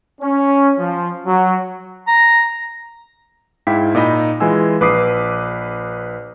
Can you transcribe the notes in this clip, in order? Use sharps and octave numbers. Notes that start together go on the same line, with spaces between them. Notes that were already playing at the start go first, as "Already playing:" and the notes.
C#4
F3
F#3
A#5
G#2 E4 F5 G5 B6
A#2 D#4 D#5 B5
E3 G#3 F4 G#5 E6
A#1 B4 D6 D#6 C7